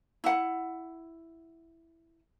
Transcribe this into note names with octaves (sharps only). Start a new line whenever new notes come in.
E4 F#5